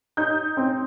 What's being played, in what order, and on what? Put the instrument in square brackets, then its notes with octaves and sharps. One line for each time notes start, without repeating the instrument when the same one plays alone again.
[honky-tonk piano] D#4 G6
C4